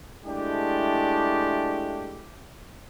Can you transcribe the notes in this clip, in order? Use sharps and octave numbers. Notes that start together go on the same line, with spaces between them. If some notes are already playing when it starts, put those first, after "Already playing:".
G#3 A3 D4 E4 G4